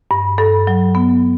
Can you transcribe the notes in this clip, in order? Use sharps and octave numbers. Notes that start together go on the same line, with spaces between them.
G2
G2 A4
F#3
B3